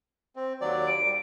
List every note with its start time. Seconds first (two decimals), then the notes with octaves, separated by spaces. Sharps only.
0.36 C4
0.61 D#2 F#3 D5
0.87 D7
1.05 G3